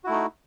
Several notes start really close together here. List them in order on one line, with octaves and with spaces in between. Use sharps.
F#4 E4 A3 D#4